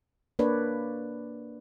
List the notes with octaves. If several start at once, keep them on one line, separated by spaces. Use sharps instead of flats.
A#3 D4 B4 C#5 D5